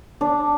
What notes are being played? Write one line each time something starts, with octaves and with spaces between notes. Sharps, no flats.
D4